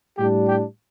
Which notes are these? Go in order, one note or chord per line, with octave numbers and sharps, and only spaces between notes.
A2 G3 D4 G4
G4